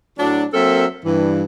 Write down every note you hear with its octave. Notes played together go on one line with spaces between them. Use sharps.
A2 F#3 D4
F#3 A#3 C4 A4 A#4 E5
G2 E3